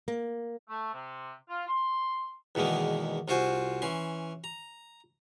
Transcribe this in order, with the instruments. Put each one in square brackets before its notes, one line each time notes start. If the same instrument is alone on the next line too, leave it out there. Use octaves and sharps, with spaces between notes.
[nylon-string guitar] A#3
[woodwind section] A3
C3
F4
C6
[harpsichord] E2 B2 D#3 G#3 A#3
C2 F4 F#4 C5 G#5
E3 C#4 C6
A#5